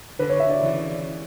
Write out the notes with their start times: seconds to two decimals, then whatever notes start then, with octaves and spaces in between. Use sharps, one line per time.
0.19 D3 B4
0.29 C#5
0.40 E5
0.50 D5
0.59 C#3 E3